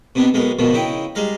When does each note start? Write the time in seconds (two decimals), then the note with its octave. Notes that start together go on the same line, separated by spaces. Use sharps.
0.15 C3 B3 D4 D#4
0.34 B1 G#3 B3 A#4
0.59 G#2 B2 D#3 F3
0.74 C#3 D#4 E4 G5
1.15 G3 G#3 F5 A#5